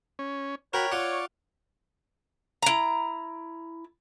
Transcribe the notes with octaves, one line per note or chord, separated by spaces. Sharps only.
C#4
F#4 A#4 C#5 G5 B5
F4 D5 F#5 C#6
E4 A#5